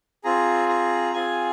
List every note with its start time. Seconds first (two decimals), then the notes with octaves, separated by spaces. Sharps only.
0.24 C4 F4 G#4 A#5
0.68 A#5
1.14 C4 F4 G#4 G#5